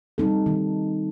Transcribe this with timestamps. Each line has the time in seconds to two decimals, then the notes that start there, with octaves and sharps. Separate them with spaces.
0.18 G3 C4 D#4 A4
0.46 D#3